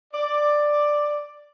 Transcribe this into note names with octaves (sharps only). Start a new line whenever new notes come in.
D5